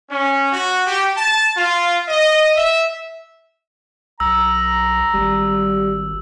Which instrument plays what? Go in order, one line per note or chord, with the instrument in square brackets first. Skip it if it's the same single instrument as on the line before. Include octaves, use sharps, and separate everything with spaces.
[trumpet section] C#4
F#4
G4
A5
F4
D#5
E5
[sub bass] B1 [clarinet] A#5 [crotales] E6
[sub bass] G#1 [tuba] G3